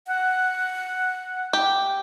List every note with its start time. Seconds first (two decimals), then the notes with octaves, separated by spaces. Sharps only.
0.07 F#5
1.53 G4